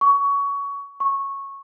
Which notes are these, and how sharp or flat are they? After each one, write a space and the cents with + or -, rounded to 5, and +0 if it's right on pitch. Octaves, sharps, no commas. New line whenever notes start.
C#6 +20
C#6 -10